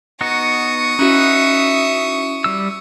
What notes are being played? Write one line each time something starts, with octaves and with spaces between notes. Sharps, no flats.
B3 D#4 F#4 C#6 D#6
C#4 D#4 E4 F#4 B4 E5
G3 E6